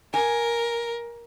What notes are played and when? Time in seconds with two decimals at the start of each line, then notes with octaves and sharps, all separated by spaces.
0.14 A#4 G#5